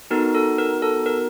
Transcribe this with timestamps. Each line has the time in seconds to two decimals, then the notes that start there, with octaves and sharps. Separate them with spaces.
0.11 B3 D#4 F#4 A4 A#4
0.35 A4
0.58 A#4
0.82 A4
1.06 A#4